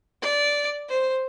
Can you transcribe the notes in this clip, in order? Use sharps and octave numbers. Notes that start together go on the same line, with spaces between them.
D5
C5